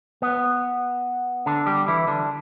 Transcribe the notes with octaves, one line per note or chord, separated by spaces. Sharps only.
B3
D3 D4
G3 G4
E3 E4
D3 D4